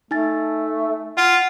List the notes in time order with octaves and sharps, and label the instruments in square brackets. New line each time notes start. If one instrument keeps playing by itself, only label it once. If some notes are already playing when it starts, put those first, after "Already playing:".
[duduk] A3 [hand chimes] D#4 G#5 A6
[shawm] F4 [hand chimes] F#5